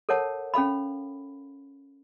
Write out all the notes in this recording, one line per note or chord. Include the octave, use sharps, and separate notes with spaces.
A4 A#4 C#5 F#5 A5
C#4 A4 F5 B5